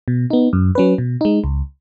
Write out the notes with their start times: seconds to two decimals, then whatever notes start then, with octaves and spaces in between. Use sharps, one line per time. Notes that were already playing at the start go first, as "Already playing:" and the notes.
0.08 B2
0.30 B3 D#4
0.53 F#2
0.75 F#3 C#4 B4
0.98 B2
1.21 G#3 D#4
1.44 C#2